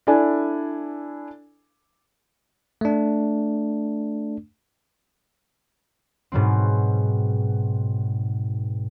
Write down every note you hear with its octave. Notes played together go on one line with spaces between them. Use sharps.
D4 E4 A4 G#5
A3 D4
G#2 B2 F#3 C4